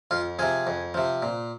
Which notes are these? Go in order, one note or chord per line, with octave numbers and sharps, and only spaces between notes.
F2 F4
C3 F3 G#4
F2
C3 F3
A#2